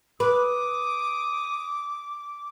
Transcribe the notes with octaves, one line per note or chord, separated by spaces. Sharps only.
B4 D6 D#6